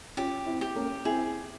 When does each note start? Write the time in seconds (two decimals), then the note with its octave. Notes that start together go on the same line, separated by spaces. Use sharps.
0.17 C#4 F4 G4
0.46 C4 E4
0.61 G4
0.76 A#3 C#4
1.05 C4 E4 G#4